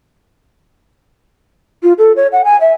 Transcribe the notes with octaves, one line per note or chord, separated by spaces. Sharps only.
F4
A4
C#5
F#5
G#5
E5